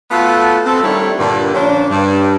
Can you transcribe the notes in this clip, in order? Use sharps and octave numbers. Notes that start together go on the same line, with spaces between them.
A3 B3 F4 F#4 A4
C4 A4
D#3 G3 A3 D4 E4 C#5
G2 A#2 D3
A#2 F3 C#4 D4
G2